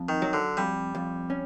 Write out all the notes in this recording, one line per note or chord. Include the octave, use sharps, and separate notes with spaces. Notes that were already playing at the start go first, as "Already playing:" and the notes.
Already playing: F2
D#3
F#3
D3
F2 G3
F2
C#4